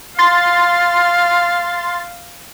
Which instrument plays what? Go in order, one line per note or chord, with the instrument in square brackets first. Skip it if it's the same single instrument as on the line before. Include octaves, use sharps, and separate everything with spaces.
[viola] F5 [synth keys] C6 A6